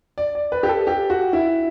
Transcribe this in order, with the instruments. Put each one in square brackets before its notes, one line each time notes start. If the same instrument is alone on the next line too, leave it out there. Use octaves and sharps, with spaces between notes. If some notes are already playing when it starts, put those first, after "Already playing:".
[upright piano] D5
D5
B4
G4
A4
G4
F#4
E4